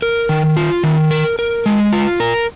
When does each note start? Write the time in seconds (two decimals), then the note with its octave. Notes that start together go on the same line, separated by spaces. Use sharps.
0.02 A#4
0.29 D#3
0.56 F4
0.83 D#3
1.11 A#4
1.39 A#4
1.66 G#3
1.93 F4
2.20 A#4